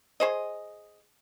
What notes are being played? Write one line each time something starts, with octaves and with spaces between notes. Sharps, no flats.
G#4 C5 D#5